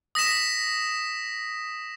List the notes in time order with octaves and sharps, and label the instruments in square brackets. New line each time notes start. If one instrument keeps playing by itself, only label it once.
[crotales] D#6 A#6 B6 E7